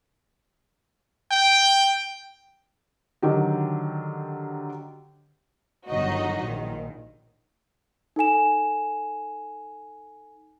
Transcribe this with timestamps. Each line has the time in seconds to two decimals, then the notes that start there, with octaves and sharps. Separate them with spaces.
1.31 G5
3.22 D3 D#3 F#3 G4
5.88 G1 D#3 F#3 D#4 F#4 D#5
6.42 A#1 D#3
8.16 D#4 A4 G#5 E7